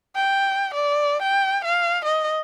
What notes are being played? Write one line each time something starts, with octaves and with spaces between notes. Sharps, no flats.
G5
D5
G5
F5
D#5